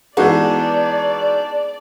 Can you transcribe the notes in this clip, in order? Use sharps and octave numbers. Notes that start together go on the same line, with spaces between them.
E3 G#3 B3 D4 D#4 F#4 D5